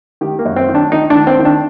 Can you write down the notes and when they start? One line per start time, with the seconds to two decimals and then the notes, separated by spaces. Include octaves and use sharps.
0.21 D#3 G4
0.39 A#3
0.45 F#2
0.56 C4
0.69 D#3
0.74 D4
0.92 D#3 D#4
1.10 D4
1.15 D#3
1.27 C4
1.39 D#3
1.45 D4